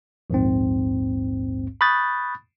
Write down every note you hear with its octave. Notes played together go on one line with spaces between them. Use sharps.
A#1 D#2 G#2 C4
B5 C#6 D#6 F#6 G6 A6